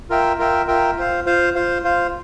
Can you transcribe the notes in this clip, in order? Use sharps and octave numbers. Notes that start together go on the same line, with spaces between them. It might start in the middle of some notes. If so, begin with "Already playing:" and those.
F4 A#4 E5 G5
F4 A#4 E5 G5
F4 A#4 E5 G5
F4 C5 F5
F4 C5 F5
F4 C5 F5
F4 C5 F5